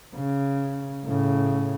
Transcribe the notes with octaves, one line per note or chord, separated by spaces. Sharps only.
C#3
A2 C#3